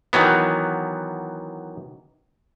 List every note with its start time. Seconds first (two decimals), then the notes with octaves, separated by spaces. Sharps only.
0.13 D#3 E3 F#3 B3